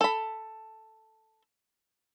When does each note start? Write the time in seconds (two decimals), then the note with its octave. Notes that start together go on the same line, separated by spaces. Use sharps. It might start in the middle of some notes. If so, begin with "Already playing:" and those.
0.01 A4 B5